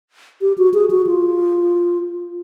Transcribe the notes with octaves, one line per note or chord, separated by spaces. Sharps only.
G4
F#4
G#4
F#4
F4